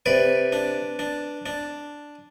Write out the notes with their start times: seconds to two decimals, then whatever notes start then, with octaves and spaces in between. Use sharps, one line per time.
0.06 C3 B4 D5
0.52 D4
0.99 D4
1.46 D4